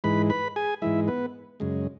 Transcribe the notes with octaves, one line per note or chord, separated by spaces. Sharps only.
G#2 E3 G#3 B4 B5
B4 B5
G#4 G#5
G#2 E3 G#3 E4 E5
B3 B4
F#2 C#3 G#3